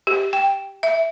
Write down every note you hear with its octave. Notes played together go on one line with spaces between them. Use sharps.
G4
G5
E5